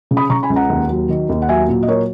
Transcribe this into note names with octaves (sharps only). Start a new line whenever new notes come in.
C#3
B5 D#6
C#3 A#5 C#6
G#5 B5
C#2
F#5 A#5
D#2
F#3
D#3
D#2
F#5
F#3 E5 G#5
A#2
D#5
F#3 A#4 C#5